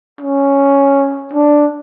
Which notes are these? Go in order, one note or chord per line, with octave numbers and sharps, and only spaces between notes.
C#4
D4